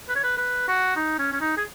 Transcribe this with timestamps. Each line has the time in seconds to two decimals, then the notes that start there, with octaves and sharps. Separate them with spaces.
0.09 B4
0.16 C#5
0.24 B4
0.38 B4
0.68 F#4
0.96 D#4
1.19 C#4
1.33 C#4
1.41 D#4
1.57 G#4